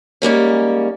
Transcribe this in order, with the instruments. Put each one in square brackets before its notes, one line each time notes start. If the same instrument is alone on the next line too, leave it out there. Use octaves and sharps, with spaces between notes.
[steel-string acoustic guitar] G#2 G3 A#3 C#4